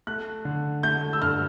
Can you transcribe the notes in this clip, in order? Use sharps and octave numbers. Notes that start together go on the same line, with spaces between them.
A3 F#6
D3
A3 G6
E6
G2 F6